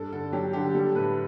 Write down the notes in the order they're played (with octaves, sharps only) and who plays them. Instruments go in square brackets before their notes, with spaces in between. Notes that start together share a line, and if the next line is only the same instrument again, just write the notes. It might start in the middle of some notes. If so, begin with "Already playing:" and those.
Already playing: [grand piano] G2 A4
D3 A4
F#3 G4
D3 G4
G3 A4
A2 B4